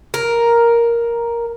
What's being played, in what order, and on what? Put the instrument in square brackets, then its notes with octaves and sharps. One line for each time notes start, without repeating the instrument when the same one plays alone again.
[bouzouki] A#4